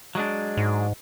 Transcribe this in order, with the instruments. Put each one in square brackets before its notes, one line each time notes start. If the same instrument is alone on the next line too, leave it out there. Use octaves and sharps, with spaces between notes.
[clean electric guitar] F#3 G#3 D4
[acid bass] G#2